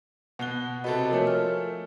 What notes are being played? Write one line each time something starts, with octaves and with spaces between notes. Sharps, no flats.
B2 F#5 F#6 G7
C3 F#4 A4 B4 D#5
F3 A3 A#4 C#5 G#5
F6